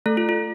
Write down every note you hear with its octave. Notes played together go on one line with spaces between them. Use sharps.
A3 A4
F4
F4